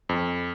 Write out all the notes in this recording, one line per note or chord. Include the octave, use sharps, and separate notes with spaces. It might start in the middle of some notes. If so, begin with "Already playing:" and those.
F2